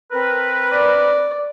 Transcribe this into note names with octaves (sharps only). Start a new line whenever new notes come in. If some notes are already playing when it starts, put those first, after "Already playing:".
C4 A#4 B4
D5